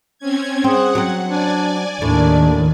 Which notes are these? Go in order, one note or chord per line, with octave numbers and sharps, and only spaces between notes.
C4 C#4 G#6
C4 G#4 F#5
F#3 C4
D4 D5 G#5
D#2 A2 D#3 D4